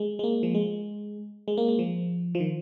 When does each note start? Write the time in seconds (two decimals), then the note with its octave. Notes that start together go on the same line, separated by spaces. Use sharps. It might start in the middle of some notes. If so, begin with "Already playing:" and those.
Already playing: G#3
0.19 G#3
0.24 A#3
0.43 F3
0.55 G#3
1.48 G#3
1.57 A#3
1.69 G#3
1.79 F3
2.35 F3
2.40 D#3